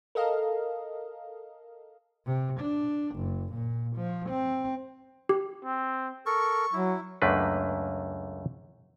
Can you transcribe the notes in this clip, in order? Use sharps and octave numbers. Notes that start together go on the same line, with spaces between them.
A4 A#4 D#5 F5
C3
D4
F#1
A#2
F3
C4
G4
C4
A4 A#4 C#6
F#3 E4
C#2 F#2 A3 A#3 D4 B4